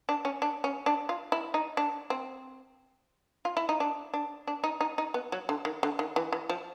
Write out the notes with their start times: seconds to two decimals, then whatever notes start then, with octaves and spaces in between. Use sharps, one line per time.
0.09 D4
0.25 C#4
0.42 D4
0.64 C#4
0.86 D4
1.09 F4
1.32 E4
1.54 D#4
1.77 D4
2.10 C4
3.45 F4
3.57 E4
3.69 D#4
3.80 D4
4.14 D4
4.47 D4
4.64 D#4
4.81 D#4
4.98 D#4
5.14 B3
5.32 F#3
5.49 D3
5.65 D#3
5.83 D3
5.99 D#3
6.16 E3
6.32 E3
6.49 F3